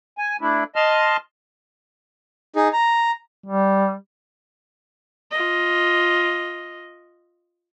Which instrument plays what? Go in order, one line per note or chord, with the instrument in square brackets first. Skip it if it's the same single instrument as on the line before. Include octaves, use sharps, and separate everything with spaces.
[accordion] G#5
A3 D4 E4
D#5 A5 C6 F6
[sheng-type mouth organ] D#4 G#4
A#5
[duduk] G3
[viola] F4 D#5